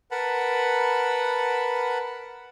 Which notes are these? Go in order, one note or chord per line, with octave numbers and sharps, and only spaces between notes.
A#4 B4 F#5 A5 B5